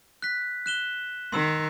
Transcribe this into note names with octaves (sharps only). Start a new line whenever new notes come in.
F#6 B6
F#6 E7 G7
D#3 C6 E6